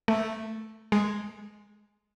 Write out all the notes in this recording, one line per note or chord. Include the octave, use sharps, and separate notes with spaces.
A3
G#3